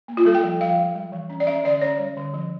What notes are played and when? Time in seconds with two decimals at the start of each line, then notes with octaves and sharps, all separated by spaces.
0.08 A#3
0.17 F4
0.25 G3 A4
0.34 G5
0.43 F3
0.61 F3 F5
0.78 G3
0.95 G3
1.12 E3
1.30 C#4
1.40 D5
1.47 C#4 E5
1.64 D3 D5
1.82 C#4 C#5
1.99 G3
2.17 D3
2.34 F3